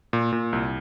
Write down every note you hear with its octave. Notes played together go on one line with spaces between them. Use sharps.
A#2
A#2
C2